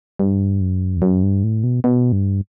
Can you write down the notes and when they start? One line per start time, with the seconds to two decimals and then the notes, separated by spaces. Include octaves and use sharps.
0.19 G2
0.61 F#2
0.97 E2
1.02 F#2
1.23 G2
1.44 A2
1.64 B2
1.84 B2
2.12 G2